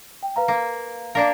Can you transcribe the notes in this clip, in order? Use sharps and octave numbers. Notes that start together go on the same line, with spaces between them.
G5
B4 F5 A#5
A#3
A#3 D4 A#4 D5 F5